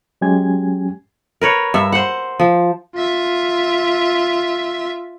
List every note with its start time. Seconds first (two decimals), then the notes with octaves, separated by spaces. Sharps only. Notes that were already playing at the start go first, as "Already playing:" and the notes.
0.21 F#3 G#3 C#4 G4 G#5 G#6
1.41 A#4 B4 C#5
1.74 G2 E5
1.92 C5 F#5
2.40 F3
2.95 F4 E5